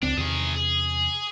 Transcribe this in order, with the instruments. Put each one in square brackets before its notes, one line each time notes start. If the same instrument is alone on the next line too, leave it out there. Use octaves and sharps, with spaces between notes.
[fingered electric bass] C#2 C#3 C4 [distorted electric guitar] D4
[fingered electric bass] E2 C3 [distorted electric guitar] D#3 G#4
[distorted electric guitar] G#4